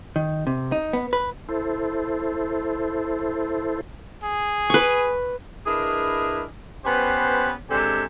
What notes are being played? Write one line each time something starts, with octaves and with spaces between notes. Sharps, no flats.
D#3
C3
D#4
B3
B4
E4 A4 C5
G#4
B4 C#6
D4 E4 G#4 A#4 B4 D#5
B3 C#4 G4 B4 C5
C3 G#3 D4 A4 D5 G#5